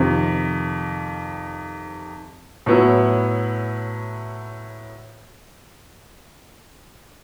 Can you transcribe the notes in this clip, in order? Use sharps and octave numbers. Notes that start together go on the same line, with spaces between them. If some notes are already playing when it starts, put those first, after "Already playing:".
Already playing: F2 C3 D#3
A2 F#3 B3 E4